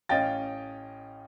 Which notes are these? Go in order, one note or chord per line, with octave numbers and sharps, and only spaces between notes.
A1 C#4 D#5 F5 G5 A6